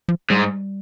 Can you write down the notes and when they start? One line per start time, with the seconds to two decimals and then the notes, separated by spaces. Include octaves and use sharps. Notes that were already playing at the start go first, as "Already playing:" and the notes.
0.08 F3
0.30 G#2 G3